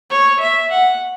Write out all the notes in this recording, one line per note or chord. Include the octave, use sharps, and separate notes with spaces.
C#5
E5
F#5